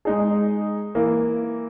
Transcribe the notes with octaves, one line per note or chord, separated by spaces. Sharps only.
G#3 D#4 G#4
E3 A#3